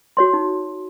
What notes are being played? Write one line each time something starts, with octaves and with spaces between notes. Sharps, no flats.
F#4 C#5 C6
D#4